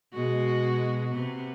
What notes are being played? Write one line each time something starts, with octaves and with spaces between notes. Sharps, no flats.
B2 G#3 F#4
C3 B3